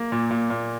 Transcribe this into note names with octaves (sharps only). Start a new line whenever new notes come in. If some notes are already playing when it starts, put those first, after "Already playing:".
Already playing: A#3
A#2
A#2
A#2